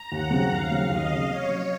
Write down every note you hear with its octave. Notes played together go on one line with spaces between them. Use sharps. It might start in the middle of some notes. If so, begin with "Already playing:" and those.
Already playing: A#5
D#2 F#5
C#3 F#3 C4
D#2 F5
C#3 F#3 C4
D#2 D#5
C#3 F#3 C4
C3 C#5
F#3 C#4